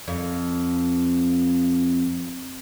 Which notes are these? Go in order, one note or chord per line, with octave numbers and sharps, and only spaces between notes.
F2